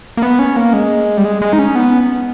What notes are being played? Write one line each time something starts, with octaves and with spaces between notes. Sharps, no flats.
A#3
B3
C#4
A#3
G#3
G3
G#3
G#3
D#4
C#4
B3